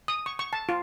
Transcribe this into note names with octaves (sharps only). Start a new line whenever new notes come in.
D#6
C#6
C#6
A5
F4